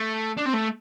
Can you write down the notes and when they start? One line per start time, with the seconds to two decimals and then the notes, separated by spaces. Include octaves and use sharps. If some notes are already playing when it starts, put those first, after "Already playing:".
Already playing: A3
0.38 D4
0.46 C4
0.54 A3